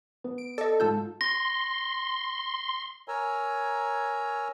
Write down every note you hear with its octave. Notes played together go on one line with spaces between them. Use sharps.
B3
D7
A4 D5 D#5
G#2 F4 A5 E6 G6
C6 A#6
A#4 C#5 G#5 A#5 E6